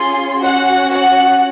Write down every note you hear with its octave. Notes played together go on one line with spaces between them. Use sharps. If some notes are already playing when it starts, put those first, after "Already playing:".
Already playing: C#4 F4 G#4 C6
C#4 F#4 F#5
F#5